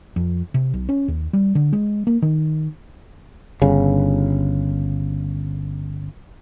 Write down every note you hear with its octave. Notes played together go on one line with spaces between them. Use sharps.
F2
C3
B1
C#4
D#2
G3
D3
G#3
A#3
D#3
G1 C#3